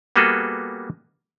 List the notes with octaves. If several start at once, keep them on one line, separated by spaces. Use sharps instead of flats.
G3 A#3 B3 F#4 G#4 A4